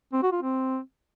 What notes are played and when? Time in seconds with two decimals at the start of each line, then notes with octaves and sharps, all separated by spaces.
0.13 C4
0.23 F#4
0.32 F4
0.42 C4